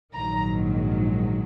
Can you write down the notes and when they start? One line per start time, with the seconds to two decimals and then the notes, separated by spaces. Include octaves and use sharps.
0.14 A#1 G#2 D#3 F#3 A#5